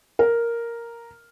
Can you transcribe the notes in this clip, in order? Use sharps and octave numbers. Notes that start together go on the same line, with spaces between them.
A#4